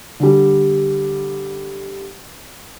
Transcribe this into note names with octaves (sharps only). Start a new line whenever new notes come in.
D3 G3